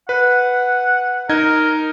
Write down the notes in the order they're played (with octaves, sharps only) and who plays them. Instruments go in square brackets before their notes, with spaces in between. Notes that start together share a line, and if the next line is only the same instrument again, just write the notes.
[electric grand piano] B4 [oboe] F#5
[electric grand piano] D#4 D#5 G#6 [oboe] A#4